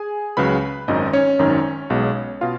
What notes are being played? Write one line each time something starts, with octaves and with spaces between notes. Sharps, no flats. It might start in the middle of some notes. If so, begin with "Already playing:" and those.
Already playing: G#4 G#5
C#2 C#3 F#3 B4 B5
G#1 F#2 D#3 D#4 D#5
C#4 C#5
G#1 F#2 D#3
B1 B2 G#3
B2 F4 F5